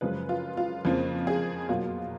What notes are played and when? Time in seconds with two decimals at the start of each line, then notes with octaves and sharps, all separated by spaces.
0.01 F#2 C#3 F3 G#3 B4
0.29 F4
0.57 F4
0.85 F2 C#3 F3 A#3
1.27 G#4
1.69 B2 F#3 A#3 F4